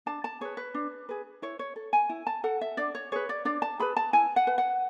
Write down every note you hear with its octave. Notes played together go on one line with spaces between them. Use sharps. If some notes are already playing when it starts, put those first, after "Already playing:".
D4 A5
A5
G#4 B4 C#5
B4
D4
G#4 B4
E4 C#5
C#5
A4
G#5
E4
A5
A4 F#5
E5
D4 D5
C#5
G#4 B4 C#5
D5
D4 D5
A5
G#4 B4 B5
A5
E4 G#5
F#5
B4
F#5